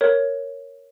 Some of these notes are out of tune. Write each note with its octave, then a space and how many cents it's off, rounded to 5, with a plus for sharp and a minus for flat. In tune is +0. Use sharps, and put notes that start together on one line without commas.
A#4 +0 C#5 +0